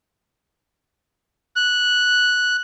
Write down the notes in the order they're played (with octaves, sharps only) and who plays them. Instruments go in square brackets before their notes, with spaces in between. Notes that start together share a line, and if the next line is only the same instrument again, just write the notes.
[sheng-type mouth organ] F#6